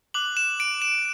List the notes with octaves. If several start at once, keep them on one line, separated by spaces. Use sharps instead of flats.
D6 F#6 F#7
E7
D7
E7